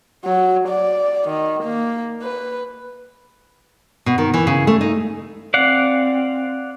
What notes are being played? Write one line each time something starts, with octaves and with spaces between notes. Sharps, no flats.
F#3
D5
D#3
A#3
B4
B2
D#3
E3
C#3
A3
D#4
C4 D5 F5 F#5